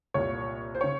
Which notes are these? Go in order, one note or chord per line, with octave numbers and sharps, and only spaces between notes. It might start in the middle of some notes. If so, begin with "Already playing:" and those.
C2 A#2 C#5
C5
C#3 C#5